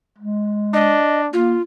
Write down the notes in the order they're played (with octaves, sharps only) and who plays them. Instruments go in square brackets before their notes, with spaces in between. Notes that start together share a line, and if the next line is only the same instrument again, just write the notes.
[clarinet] G#3
[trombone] D4 [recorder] D#5
[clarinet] A#3 [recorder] F4